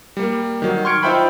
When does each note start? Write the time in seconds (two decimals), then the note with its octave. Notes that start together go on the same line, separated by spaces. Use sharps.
0.17 G3 A#3
0.62 D#3 F#3
0.85 C6 C#6 F6 G#6 C#7 D7
1.03 D#4 F4 C5 E5 G5 B5